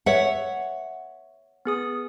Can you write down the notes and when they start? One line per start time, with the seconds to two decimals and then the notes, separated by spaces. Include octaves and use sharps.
0.06 C#5 E5 F#5
1.65 B3 G#4 D#6